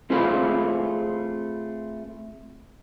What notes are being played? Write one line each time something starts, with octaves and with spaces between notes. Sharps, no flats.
A3 C4 F4 G#4 B4 F5